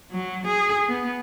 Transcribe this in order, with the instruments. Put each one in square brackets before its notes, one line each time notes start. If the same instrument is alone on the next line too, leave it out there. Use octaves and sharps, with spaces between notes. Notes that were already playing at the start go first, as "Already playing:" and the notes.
[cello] F#3
G#4
B3